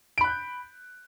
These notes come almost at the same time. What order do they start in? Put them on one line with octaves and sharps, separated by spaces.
D7 B5 F#6 G6